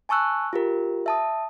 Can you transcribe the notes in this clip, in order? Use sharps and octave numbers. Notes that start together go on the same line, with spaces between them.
G#5 A5 C#6 E6 F#6
F4 G4 A#4
E5 A5 D#6